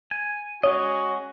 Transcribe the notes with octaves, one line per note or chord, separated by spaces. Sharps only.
G#5
G#3 C#4 F#4 C#5 D#5